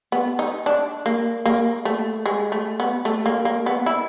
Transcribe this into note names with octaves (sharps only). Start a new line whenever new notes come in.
B3
D#4
D4
A#3
A#3
A3
G#3
A3
B3
A3
A#3
A#3
B3
E4